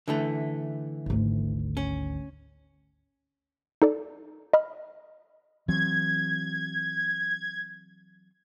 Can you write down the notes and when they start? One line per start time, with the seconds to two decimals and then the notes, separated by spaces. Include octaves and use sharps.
0.08 D3 E3 A3
1.06 G#1 D2
1.77 C#4
3.82 D#4 A4 D5
4.53 D#5 B5 F6
5.68 E3 F#3 C4 G#6